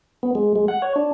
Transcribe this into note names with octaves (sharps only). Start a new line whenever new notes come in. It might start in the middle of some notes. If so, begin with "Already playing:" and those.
B3
G#3
G#3
F#5
C#5
D4